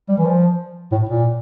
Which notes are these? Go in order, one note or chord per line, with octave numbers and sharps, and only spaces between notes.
G3
E3
F3
A2
A#2